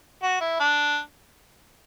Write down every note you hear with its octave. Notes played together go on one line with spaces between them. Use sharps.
F#4
E4
D4